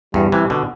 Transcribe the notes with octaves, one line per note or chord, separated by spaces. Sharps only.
E2 G2 G3
C3 E3
B2 D3